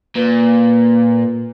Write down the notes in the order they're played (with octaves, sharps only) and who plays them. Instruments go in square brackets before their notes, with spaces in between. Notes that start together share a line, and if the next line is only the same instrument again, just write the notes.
[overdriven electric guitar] A#2 [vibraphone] B4